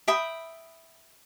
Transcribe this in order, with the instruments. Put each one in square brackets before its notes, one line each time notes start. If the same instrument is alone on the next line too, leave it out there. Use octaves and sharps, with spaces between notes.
[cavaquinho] E5 G5 B5 D#6